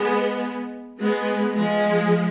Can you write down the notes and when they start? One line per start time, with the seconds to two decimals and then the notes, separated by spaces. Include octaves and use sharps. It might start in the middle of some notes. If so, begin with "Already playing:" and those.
Already playing: G#3 B3
0.99 G#3 B3
1.56 F3 G#3